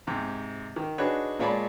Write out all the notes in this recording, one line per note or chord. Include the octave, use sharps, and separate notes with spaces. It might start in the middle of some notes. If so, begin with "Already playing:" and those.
G#2 C3
D#3
D4 D#4 F#4 G#4 B4 C#5
A#2 G#3 C#5 D5 A5 B5